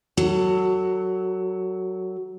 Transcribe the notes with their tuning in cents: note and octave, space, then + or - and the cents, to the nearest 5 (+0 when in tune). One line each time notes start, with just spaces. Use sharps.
F#3 +10 A4 +30